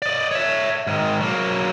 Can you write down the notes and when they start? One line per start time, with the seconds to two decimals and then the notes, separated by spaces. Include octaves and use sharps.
0.02 D5 D#5
0.31 C#5 E5
0.87 G#2 D#3
1.21 F#3 A#3